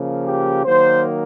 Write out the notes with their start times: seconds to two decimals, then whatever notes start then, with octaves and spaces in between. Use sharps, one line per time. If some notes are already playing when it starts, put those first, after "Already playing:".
Already playing: C#3 F3 A#3
0.25 G4
0.66 D#3 F#3 A#3 C5